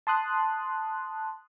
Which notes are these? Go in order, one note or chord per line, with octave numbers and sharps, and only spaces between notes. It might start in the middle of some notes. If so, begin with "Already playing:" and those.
A5 C6 D#6 F#6